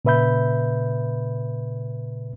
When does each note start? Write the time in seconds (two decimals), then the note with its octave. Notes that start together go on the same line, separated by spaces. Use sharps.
0.05 A#2 C#3 B4 E5 B5 G6